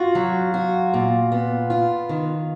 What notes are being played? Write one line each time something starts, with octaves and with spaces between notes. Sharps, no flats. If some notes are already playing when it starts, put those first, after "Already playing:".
Already playing: F4 F#4
F#3
F#4
A#2
B3
F4
D#3